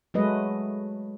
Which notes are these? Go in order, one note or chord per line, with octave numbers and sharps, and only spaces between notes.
F#3 G#3 A3 B4 D#5